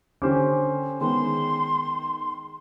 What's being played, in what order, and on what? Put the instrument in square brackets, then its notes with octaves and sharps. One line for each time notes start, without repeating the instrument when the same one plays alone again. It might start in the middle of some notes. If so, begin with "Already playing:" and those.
[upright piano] D3 G4 D6 [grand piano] C#4 C5
[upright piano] D#3 G#3 B3 [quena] C6